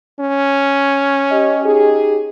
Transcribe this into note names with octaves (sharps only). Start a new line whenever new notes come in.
C#4
G4 D#5
D#4 G4 G#4